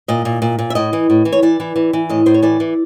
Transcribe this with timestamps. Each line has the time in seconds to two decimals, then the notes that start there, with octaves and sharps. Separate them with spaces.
0.08 A#2 D#5
0.25 A#2
0.42 A#2
0.59 A#2
0.70 E5
0.75 A2 D#5
0.93 E3
1.10 A2
1.25 E3
1.33 C#5
1.42 E3 D5
1.60 E3
1.76 E3
1.93 E3
2.09 A2 D#5
2.26 A2 C5
2.34 C#5
2.42 E3 D5
2.60 E3